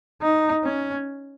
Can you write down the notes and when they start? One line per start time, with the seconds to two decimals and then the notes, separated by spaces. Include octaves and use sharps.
0.22 D#4
0.64 C#4